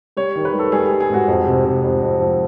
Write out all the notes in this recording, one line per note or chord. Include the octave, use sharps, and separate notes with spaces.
G3 C#5
D#3
B4
G3 A4
G3 G#4
G#4
G3
G#4
G#2 F#4
F2
C3
C3
F2
F2
F3